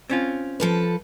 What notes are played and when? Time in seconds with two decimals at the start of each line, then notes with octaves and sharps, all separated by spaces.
0.10 C4 C#4 F4
0.60 F3 A4 B4